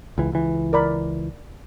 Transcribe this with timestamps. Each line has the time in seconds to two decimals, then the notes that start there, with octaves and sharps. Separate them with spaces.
0.18 C#2 E3
0.32 C#2 E3
0.73 A#4 D5 B5